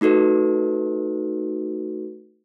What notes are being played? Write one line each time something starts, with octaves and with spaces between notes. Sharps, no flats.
A3 D#4 F#4 A4 B4